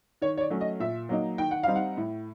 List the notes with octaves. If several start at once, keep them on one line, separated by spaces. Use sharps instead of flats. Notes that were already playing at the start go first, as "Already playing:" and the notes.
D#3 C#5
C#5
D5
F#3 A3 C#4
D#5
A#2 E5
F#3 A#3 D#4
D#3 G5
F#5
G3 C4 D#4 F5
F#5
A2